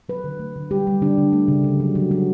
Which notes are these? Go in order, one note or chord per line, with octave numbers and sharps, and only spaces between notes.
F#3 B4
D3
A3
D3
G3 G4
G3
D3 D4
D3
A3
C#3
C#3
F#3
F#3
F#3